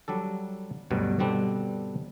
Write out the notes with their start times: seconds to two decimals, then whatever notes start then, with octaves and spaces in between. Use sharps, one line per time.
0.08 F#3 G3 D4 A4
0.90 D2 G2 B2 F#3 G3
1.19 G2 B2 D3 G3 C4 D4